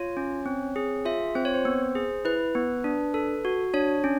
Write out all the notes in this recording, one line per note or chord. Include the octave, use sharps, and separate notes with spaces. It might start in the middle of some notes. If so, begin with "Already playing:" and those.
Already playing: F4 C#5
C#4
C4
G#4
F4 E5
C4 C5
C#5
C5
B3
G#4
E4 B4
B3
D4
A4
F#4
D4 C#5
C#4